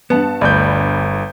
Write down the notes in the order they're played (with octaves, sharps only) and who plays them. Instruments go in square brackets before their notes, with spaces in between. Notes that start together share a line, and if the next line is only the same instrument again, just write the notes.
[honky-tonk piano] G2 A5 C#7 [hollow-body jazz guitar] B3
[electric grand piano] G1 G6 [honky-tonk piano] D2 D5 B5